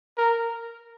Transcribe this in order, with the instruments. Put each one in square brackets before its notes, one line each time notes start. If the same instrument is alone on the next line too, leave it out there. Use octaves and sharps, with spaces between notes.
[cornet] A#4